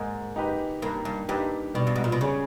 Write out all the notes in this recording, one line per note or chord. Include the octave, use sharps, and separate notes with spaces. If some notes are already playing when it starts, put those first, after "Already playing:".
Already playing: G#2 A#3
D#4 G4 B4
G2 A#3
G2
G2 D#4 G4 B4
B2 G3
G2
G#2
A#2
B2
C#3 C#4 G#4 C#5